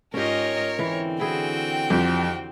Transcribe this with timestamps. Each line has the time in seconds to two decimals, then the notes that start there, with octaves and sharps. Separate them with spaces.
0.14 G#2 C#4 F4 G4 A#4 C#5 D#5
0.79 D3 E3 C4
1.19 E4 F#4 G#4 G5
1.90 F2 G4 C5